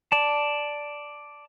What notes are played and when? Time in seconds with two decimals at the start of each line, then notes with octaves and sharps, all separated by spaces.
0.12 D5 A5